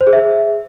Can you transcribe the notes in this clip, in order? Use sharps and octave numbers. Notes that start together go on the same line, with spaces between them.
C5
G#4
E5